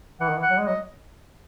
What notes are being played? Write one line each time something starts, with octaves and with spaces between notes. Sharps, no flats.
E3 F#5
D#3
E3
F#5
F#3
G#3
F#3 D#5